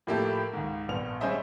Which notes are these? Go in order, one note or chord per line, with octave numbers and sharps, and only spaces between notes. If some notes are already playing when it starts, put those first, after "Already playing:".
A2 F3 A#3 E4 G4 A4
C#2 G#2
A#1 G2 B3 F7
G3 C#4 G#4 C5 D#5 E5